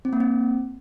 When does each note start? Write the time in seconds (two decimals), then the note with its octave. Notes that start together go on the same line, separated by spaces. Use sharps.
0.05 C4
0.13 A#3
0.20 C4